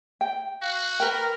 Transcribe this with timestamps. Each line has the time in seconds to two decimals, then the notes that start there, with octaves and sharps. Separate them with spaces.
0.21 G5
0.62 F#4 F5
1.00 A#4 B4 G5